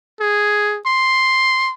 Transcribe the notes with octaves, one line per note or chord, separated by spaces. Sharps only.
G#4
C6